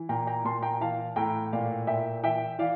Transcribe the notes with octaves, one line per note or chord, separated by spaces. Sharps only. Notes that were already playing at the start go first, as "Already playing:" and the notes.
Already playing: E3
A#2 G5 A#5
G5 A#5
A#2 A5 C6
G5 A#5
E3 F5 A5
A2 G5 A#5
A#2 D5 F5
A#2 E5 G5
E3 E5 G5
E3 D5 F5